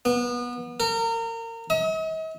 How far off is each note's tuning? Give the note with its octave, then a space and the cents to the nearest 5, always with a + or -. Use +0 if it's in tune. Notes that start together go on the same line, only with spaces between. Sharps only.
B3 -25
A#4 -30
D#5 +45